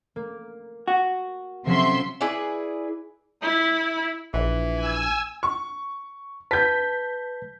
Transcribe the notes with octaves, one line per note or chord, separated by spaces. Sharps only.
A#3
F#4
C3 F3 F#3 C#4 E5 C6
E4 G#4 B4 D5
E4 B5
A#1 E3
G#5 E6
C#6
B4 A5 G6 B6